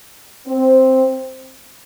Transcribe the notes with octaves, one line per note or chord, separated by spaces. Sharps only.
C4